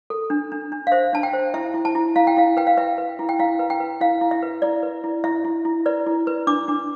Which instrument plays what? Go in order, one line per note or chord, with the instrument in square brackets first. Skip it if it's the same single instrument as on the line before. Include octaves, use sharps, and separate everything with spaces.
[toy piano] A4
D4
D4
D4
F5
C5 E5
D4 A5
G5
C5
E4 E5
E4
A5
E4
E4 F5
G5
E4 F5
B4 G5
F5
B4 E5
B4
E4
G5
E4 F5
B4
G5
B4
E4 F5
E4
E5
B4
E4 D5
B4
E4
E4 E5
E4
E4
B4 D5
E4
B4
D4 D6
D4